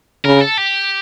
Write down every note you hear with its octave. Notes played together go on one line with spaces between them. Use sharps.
C#3 A#4
A4
G4